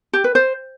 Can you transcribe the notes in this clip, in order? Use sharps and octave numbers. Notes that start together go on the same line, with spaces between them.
G4
B4
C5